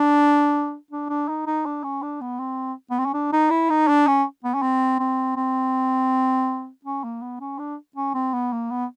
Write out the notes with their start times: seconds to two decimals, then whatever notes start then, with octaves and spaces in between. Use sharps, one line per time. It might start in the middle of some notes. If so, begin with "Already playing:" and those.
Already playing: D4
0.91 D4
1.09 D4
1.28 D#4
1.47 D#4
1.66 D4
1.84 C#4
2.02 D4
2.21 B3
2.39 C4
2.91 B3
2.99 C4
3.06 C#4
3.14 D4
3.32 D#4
3.51 E4
3.70 D#4
3.88 D4
4.07 C#4
4.44 B3
4.55 C#4
4.62 C4
4.99 C4
5.37 C4
6.85 C#4
7.04 A#3
7.22 B3
7.40 C#4
7.59 D4
7.96 C#4
8.14 C4
8.34 B3
8.53 A#3
8.71 B3